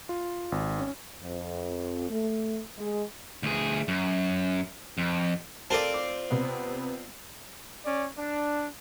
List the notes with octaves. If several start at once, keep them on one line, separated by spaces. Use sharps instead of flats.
F4
G#1
C#4
F2
A3
G#3
D2 G#4
F#2
F2
C4 F4 A4 A#4 D5 A5
D6
C3 B3
C#4 D5
D4